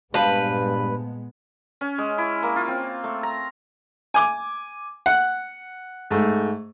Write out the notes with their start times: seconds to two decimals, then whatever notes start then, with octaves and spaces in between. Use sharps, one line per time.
0.14 G2 A#2 G#3 B3 B4 C5 F5 A5
1.81 C#4
1.98 G#3
2.18 E4
2.43 A#3
2.56 F4
2.68 C4
3.04 A3
3.23 A#5
4.14 G#5 D6
5.06 F#5
6.11 G#2 A3